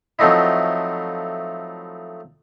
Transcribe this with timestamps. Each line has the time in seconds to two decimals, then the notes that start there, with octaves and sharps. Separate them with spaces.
0.19 F3 F#3 A3 C4 D#4 E4